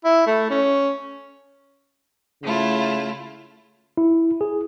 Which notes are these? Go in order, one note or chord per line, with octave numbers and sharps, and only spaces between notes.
E4
A3
C#4
C#3 A3 E4 F4
E4
G#4